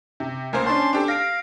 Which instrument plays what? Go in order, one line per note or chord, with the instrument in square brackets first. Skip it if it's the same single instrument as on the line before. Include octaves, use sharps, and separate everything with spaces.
[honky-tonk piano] C3
[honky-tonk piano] C#2 A#3 C5 [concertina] A#4 G#5
[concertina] C#4 A5 C6 [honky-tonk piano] D4 C5
[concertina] C4 [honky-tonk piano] D4 G4 A4
[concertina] F5 [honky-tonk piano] A#6 D7